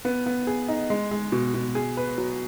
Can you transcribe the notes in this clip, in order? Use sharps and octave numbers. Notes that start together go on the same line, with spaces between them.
B3
B3
G#4
D#4
G#3
G#3
B2
B2
G#4
B4
F#3